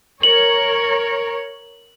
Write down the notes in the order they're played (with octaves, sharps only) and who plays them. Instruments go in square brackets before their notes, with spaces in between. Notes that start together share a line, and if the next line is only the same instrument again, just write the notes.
[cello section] A#4 C#5 [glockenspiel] F#7